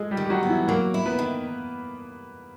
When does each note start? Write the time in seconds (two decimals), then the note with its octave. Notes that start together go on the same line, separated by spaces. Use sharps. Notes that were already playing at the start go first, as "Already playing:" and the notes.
Already playing: G#3 G#4 A4
0.11 G3 G4
0.17 D#3
0.25 G4
0.30 F#3 F#4
0.43 B3
0.49 E3 E4
0.68 F#3 A#3 A#4
0.94 E4
1.06 B3 B4
1.19 D#3